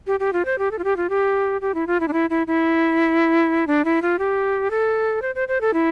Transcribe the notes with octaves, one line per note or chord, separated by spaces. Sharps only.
G4
G4
F4
C5
G4
A4
F4
G4
F4
G4
G4
E4
F4
E4
D4
E4
E4
E4
D4
E4
F4
G4
A4
C5
C5
C5
A4
E4